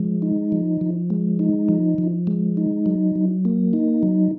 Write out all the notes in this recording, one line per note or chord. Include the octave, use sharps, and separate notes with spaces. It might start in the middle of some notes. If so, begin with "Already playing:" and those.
Already playing: F3 G#3
D#4
F3
F3
G#3
D#4
F3
F3
G#3
D#4
F#3
F#3
A#3
D#4
F#3